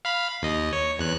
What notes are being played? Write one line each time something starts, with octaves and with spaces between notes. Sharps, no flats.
F5 B5
D#2 D#5
C#5
E2 F#6